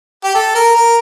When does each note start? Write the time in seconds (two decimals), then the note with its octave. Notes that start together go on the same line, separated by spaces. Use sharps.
0.24 G4
0.34 A4
0.55 A#4
0.75 A#4